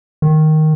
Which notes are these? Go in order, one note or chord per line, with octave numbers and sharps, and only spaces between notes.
D#3